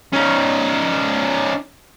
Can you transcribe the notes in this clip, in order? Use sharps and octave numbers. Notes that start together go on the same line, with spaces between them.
C#4 D#4